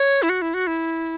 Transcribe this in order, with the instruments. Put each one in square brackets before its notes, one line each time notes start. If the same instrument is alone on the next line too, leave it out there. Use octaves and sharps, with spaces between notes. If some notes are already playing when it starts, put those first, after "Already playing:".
Already playing: [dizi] C#5
E4
F#4
E4
F#4
E4